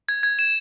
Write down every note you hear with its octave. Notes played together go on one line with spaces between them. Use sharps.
G#6
G#6
E7